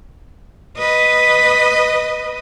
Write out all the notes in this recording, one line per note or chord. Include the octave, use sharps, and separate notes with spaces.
B4 D#5